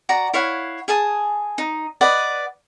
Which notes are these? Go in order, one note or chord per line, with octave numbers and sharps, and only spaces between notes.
F#4 D5 A#5
E4 C#5 F5 F#5
G#4 G#5 A5 D#6
D#4
B4 D5 D#5 F#5